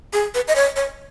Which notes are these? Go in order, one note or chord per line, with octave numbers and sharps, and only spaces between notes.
G#4
B4
D#5
C#5
C#5